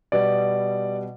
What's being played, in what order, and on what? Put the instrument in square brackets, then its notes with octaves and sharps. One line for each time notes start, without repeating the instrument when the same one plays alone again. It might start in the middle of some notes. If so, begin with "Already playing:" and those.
[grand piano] B2 G3 B3 D5